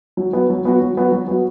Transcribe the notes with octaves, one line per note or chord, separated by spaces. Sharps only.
F#3
B3 F#4
F#3
B3 F#4
F#3
B3 F#4
F#3
B3 F#4